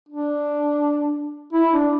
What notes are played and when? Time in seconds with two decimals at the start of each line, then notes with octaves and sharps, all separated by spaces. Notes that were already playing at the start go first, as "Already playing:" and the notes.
0.09 D4
1.53 E4
1.73 D4